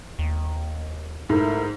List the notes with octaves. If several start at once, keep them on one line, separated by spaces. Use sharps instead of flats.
D#2
G#2 A3 E4 A#4